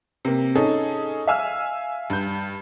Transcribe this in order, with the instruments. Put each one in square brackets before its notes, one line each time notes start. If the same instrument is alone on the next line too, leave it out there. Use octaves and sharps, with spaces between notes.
[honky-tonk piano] C3 A#3
C#4 D#4 G#4 A4
E5 F5 G#5 E6 F6
G2 G6